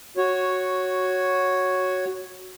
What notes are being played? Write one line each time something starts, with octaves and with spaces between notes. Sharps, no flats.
F#4 C#5